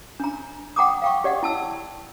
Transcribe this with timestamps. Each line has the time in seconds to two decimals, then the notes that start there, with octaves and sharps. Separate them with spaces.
0.20 D4 A#5
0.76 F#5 G5 A#5 D6 D#6
1.02 F5 G5 C#6
1.24 G4 D5 D#5 F#5
1.43 E4 A5 E6